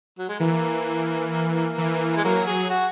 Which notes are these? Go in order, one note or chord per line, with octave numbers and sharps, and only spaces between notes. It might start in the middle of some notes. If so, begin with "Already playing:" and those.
F#3
G#3
E3 A#3
E3
G#3
F#3 A#3
G#4
F#4